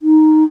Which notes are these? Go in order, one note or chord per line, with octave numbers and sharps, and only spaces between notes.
D#4